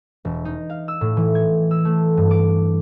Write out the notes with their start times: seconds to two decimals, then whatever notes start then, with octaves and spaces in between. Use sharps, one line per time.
0.25 E1
0.45 D#4
0.70 F5
0.88 E6
1.01 A2
1.17 E3
1.35 G#6
1.71 E6
1.85 A3
2.17 G2
2.31 D6